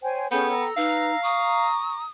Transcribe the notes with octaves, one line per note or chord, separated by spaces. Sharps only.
C5 C#5 G5 G#5
B3 C#4 G#4 A4 G5 G6
A#5 E6
D#4 B4 F5
A#5 C#6 D#6